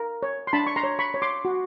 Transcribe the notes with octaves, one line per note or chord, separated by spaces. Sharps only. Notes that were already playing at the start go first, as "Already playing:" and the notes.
Already playing: A#4
C#5
C6
D4 A5 B5
C#6
A#5 C6
C#5
B5 C#6
C#5
C6 D6
F#4